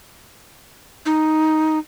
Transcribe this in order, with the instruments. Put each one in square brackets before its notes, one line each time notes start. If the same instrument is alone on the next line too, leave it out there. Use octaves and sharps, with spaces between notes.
[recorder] D#4